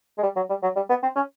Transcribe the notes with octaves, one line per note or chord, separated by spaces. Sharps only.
G#3
G3
F#3
G3
F#3
G3
B3
C4
C#4